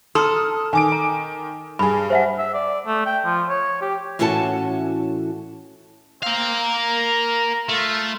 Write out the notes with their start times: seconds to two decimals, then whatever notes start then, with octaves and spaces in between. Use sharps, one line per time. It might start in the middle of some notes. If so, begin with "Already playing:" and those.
0.15 A4 A#5 C6 D#6 F6
0.73 D#3 G#5 D6 D7
0.92 A#5
1.79 G2 G#4 B5
2.10 C5 E5 F#5
2.38 E5
2.54 D5
2.87 A3
3.06 G5
3.25 F3
3.49 C#5
3.82 G4
4.19 A2 E3 C#4 F#4 A4 A5
6.23 C4 A#4 F5
6.59 A#5
7.69 A3 F4